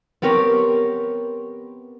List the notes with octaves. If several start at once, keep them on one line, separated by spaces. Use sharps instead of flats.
B3 C4 G4 A#4 C#5